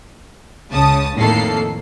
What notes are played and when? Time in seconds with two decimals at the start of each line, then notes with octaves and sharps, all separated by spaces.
0.71 C#2 C#3 A5 D#6
1.16 F2 A2 D#3 A#3 A4 C7